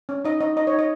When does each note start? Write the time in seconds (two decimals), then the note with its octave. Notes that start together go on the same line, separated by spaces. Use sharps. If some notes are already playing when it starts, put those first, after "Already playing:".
0.09 C#4
0.25 D#4 D#5
0.41 D#4 D#5
0.57 D#4 D#5
0.67 C#5
0.73 D#4
0.79 D#5